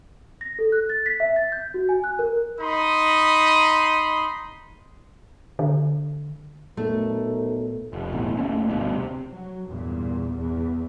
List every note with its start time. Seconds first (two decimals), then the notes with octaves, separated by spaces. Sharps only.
0.41 A#6
0.59 A4
0.72 F#6
0.90 A6
1.06 B6
1.20 E5
1.36 A6
1.52 G6
1.74 F#4
1.89 G#5
2.04 F#6
2.19 A#4
2.60 D#4 B5 C6 D#6
5.59 D3
6.77 B1 A#2 A3 A#4
7.93 F1
8.12 B1 E2 A2
8.38 F1 A3 A#3 C#4
8.69 D2 G2 B2
8.93 C3
9.31 F#3
9.66 E2 G2 A#2
10.36 E2